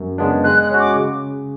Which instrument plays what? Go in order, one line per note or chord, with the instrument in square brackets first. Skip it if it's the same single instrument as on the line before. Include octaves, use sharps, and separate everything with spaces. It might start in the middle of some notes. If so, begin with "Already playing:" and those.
Already playing: [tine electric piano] F#2
C#3 G#3 B3 D4
[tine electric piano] G#3 [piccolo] F#6
[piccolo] F#6
[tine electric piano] C#4 F#4
[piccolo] D6
[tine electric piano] C#3